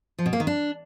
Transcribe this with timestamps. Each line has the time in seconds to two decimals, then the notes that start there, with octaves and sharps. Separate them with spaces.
0.19 F3
0.26 B2
0.33 A#3
0.40 D#3
0.47 D4